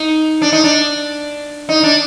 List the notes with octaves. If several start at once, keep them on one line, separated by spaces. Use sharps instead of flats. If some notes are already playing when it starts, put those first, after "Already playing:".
Already playing: D#4
D4
D#4
D4
D#4
D4